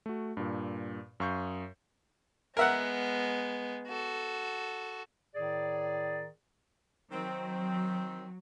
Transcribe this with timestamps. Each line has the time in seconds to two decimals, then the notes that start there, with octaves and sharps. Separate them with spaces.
0.06 A3 F#4
0.37 G2 A#2
1.20 F#2 F5 C#6 D#6 G6
2.57 G#3 B3 A#4 E5 F#5
3.88 F#4 A4
5.35 A2 D#3 G#4 D5
7.11 D#3 F#3 C4